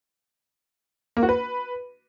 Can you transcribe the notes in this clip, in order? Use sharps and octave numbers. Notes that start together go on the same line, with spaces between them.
A#3
F#4
B4